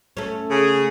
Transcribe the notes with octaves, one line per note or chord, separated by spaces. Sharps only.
A3 C#4
C#3 G#4